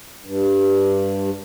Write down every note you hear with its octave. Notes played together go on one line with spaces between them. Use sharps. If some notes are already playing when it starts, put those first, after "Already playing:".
G2